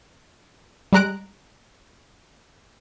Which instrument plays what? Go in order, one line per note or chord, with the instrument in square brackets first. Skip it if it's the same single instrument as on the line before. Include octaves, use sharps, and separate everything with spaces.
[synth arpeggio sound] G3 G#3 A#5 F#6 D7